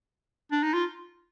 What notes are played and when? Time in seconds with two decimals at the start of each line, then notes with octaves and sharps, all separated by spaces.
0.52 D4
0.63 D#4
0.73 F4